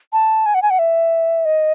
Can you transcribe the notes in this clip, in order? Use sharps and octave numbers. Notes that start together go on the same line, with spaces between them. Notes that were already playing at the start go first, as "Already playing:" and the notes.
A5
G#5
F#5
G#5
F#5
E5
D#5